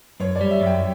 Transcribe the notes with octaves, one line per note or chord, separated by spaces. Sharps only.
F#2 C#5
D5
G3
E5
F#2
G5